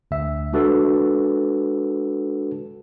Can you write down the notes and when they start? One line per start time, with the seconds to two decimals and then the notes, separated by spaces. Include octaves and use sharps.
0.11 D2 E5
0.53 G#3 D4 F#4 A4 B4